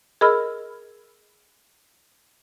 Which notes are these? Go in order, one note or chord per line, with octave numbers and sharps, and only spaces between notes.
G#4 A#4 D#5 B5 E6 F6